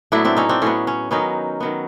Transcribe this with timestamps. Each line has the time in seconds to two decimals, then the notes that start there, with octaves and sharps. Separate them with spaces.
0.12 A2 F#3 B3 D4 E4
0.25 C4 D4
0.37 C#4 D#4
0.49 C4 D4
0.62 A2 F#3 B3 C#4
0.87 C#4
1.11 D#3 F#3 B3 C#4 D#4
1.60 D#3 F#3 B3